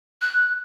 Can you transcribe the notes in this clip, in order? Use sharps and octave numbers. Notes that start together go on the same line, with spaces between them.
F#6